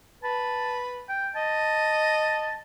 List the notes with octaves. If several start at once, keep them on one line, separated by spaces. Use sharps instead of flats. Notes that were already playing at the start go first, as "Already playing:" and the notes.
B4 A5
G5
D#5 A5